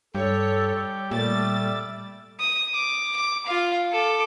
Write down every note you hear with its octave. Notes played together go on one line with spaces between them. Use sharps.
G2 G3 G4 A4 C#5
A#2 G3 A3 D5 E5 A6
D#6
D6
D6
F4 F5
A4 D6